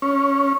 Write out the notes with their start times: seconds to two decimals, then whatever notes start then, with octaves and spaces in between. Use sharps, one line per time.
0.02 C#4